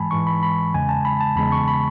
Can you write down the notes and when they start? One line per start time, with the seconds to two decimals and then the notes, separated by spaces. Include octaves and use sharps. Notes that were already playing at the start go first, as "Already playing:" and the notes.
Already playing: G#2 E3 G#3 G#5 A5 B5
0.11 G#2 E3 G#3 C#6
0.27 B5
0.43 B5
0.74 E2 C#3 G#3 G#5
0.89 A5
1.05 B5
1.20 A5
1.36 E2 C#3 G#3 B5
1.52 C#6
1.68 B5